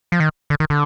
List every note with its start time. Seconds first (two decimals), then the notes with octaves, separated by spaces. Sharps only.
0.12 F3
0.20 D#3
0.50 D3
0.60 D#3
0.70 D3